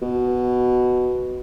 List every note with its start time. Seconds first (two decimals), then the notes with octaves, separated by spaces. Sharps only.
0.02 B2